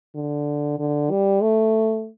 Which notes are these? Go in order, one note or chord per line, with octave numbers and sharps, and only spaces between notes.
D3
D3
G3
A3